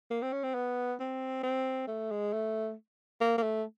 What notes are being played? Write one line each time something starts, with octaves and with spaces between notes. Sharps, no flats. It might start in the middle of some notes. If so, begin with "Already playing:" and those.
A#3
C4
C#4
C4
B3
C4
C4
A3
G#3
A3
A#3
A#3
A3